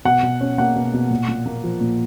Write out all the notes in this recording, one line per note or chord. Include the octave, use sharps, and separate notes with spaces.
B2 F#5
B2
C#4
A#3 F#5
B2
B2
A#2
A#2
A#3
F3
A#2